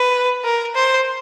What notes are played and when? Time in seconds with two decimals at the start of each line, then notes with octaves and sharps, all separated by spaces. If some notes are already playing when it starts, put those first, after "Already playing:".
Already playing: B4
0.45 A#4
0.75 C5